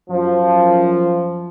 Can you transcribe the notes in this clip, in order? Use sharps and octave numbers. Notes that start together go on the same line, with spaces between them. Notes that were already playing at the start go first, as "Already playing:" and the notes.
F#2 F3